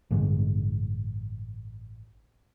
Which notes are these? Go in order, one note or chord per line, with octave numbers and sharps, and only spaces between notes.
A1 G2 D3 G#3